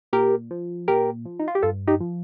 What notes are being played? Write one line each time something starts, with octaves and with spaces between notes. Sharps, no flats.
A#2 G4 A#4
F3
A#2 G4 A#4
F3
D#4
F4
G4
G2 F4 A4
D#4 G4
F3